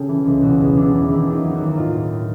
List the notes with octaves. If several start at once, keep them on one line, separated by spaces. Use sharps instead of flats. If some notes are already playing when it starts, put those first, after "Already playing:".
Already playing: C#3 G4 A4
E3
C#2
B2 E4 F#4
E2
F#3 D4 E4
E2
D#3 D4 E4
D#2
D#4 F4
F#3
E4 F#4
D#2
A2 D#4 F4